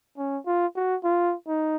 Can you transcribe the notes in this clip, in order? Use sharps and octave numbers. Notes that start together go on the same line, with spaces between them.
C#4
F4
F#4
F4
D#4